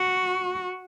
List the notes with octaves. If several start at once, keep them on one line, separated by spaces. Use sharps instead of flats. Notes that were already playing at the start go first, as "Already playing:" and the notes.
Already playing: F#4